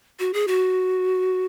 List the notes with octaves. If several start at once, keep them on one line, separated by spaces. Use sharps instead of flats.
F#4
G#4
F#4